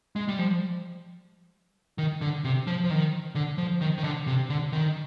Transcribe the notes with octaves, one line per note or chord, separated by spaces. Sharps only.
G#3
G3
F3
D#3
D3
C3
F3
F3
D#3
D3
F3
D#3
D#3
D3
C3
D3
D#3